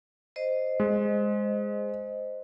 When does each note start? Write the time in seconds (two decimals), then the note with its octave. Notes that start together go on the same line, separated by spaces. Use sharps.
0.36 C5 D#5
0.80 G#3